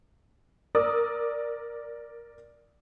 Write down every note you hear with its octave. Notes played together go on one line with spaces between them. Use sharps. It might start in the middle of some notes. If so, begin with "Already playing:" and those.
A#4 D5 D#6 E6